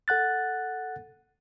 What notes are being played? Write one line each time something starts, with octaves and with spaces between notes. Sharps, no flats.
A4 F#5 F#6 A6